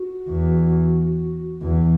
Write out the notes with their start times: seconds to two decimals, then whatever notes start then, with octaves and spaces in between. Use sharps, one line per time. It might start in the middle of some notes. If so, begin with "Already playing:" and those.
Already playing: F#4
0.29 E2
1.62 E2